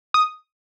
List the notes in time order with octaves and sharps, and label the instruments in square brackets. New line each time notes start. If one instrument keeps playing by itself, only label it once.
[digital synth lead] D#6